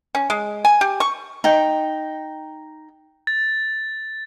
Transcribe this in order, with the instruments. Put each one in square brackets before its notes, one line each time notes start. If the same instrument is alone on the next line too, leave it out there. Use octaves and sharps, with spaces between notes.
[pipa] C#4
G#3
G#5
G4
C#6
[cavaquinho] D#4 G5
[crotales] A6